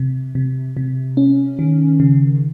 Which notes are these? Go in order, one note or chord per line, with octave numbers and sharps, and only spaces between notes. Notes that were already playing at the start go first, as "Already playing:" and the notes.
Already playing: C3
C3
C3
C#4
D#3
C#3